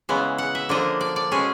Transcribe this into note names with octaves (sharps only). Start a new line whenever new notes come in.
C#3 E3 G#3 B3
F#5
E5
D3 F3 A#3 D4 D#5
D5
D5
B2 G#3 C#4 G#4